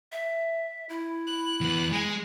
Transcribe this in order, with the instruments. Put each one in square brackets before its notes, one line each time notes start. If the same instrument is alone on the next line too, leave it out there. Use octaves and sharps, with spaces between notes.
[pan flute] E5
E4
[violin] F#6
[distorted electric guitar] E2 B3
[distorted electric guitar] G#3 [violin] G#5